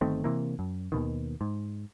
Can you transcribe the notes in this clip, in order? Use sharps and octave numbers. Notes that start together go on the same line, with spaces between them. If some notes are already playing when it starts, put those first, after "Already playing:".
G1 D#3 A3 C4
C3 E3 A#3
F#2
D#2 B2 D#3
G#2